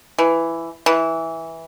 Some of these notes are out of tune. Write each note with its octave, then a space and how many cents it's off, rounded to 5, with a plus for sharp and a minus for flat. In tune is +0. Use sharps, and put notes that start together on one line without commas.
E3 +10
E3 -10